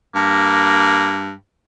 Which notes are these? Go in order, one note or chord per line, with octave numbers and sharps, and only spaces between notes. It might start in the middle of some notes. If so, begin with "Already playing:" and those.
G2 A#3